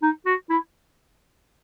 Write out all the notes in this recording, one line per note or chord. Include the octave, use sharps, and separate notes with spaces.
D#4
F#4
E4